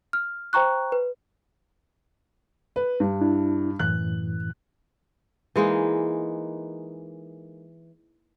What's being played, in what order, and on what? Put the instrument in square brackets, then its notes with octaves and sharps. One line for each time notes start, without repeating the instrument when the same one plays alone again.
[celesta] F6
C5 G5 A#5 C#6 F#6
B4
[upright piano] B4
G2
[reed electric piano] D4 E4
[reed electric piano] F#2 A2 E3 [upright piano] F#6
[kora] E3 G#3 A#3 D#4